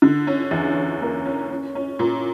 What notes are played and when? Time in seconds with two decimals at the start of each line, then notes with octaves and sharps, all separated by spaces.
0.02 D3
0.27 C#4
0.51 E2
0.76 C#4
1.01 A#3
1.26 C#4
1.50 C#4
1.75 C#4
1.99 A#2